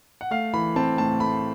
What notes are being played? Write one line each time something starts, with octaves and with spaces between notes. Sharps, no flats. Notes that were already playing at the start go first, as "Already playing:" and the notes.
F#5
A3 F5
E3 B5
C4 A5
A2 A5
A3 B5